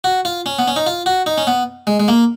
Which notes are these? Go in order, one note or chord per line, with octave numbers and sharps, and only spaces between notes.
F#4
F4
C#4
B3
C#4
D#4
F4
F#4
D#4
C#4
B3
G#3
G#3
A#3